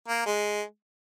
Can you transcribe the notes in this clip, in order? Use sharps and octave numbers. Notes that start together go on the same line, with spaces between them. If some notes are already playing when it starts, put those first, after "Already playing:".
A#3
G#3